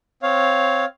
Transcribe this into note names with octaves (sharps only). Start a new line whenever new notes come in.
C4 C#5 F5